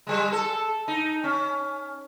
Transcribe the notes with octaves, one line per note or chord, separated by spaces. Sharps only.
G3 G#3
A4
D#4
C#4